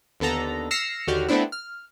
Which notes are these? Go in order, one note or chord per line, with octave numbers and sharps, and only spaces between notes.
D#2 D3 B3 A4 A#5
E6 F6 A#6 C7 C#7 E7
D#2 D3 F#4 G4 F6
A3 B3 C4 D4 E4
F6